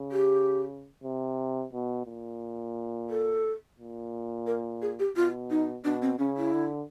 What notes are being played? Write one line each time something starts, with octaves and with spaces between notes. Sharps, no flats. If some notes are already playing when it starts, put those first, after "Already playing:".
Already playing: C#3
G4
C3
B2
A#2
A4
A#2
A#4
G#4
G4
B2 F4
D#4
B2 D4
C4
C#3 C#4
E4
D3